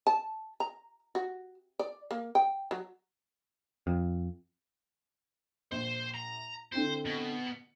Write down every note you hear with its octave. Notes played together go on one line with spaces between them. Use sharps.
A5
A#5
F#4
D5
A#3
G5
F#3
F2
A#1 C5
A#5
D3 C4 E4 C5
B2
C#7